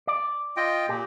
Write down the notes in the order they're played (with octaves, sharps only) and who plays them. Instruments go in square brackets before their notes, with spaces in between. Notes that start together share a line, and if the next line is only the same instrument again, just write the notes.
[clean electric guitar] D5
[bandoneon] F4 D#5 G5
[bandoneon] A#2 [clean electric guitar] G4